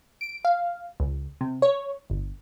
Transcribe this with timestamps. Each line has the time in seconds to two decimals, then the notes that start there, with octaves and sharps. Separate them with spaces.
0.21 D7
0.45 F5
1.00 C#2
1.41 C3
1.62 C#5
2.10 G1